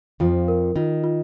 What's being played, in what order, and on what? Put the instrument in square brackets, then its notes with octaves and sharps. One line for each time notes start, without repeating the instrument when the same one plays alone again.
[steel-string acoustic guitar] F2 F3 [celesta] F4
[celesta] A#4
[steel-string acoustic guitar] D#3 [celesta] F4
[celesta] F4